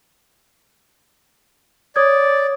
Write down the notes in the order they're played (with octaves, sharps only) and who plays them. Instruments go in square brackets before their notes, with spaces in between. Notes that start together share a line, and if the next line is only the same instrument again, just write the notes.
[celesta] C#5 D#6 G#6 [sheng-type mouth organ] D5